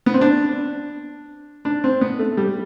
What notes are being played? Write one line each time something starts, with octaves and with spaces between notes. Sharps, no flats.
B3
C4
D4
D4
C4
B3
A3
G3